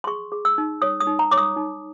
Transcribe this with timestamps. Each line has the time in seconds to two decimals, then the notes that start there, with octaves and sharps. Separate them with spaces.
0.04 C6
0.07 G#4 C#6
0.32 G#4
0.45 E6
0.58 D#4
0.82 C#5 D#6
1.00 D#6
1.07 D#4
1.19 A#5
1.31 C#5 D6
1.38 D#6
1.56 D#4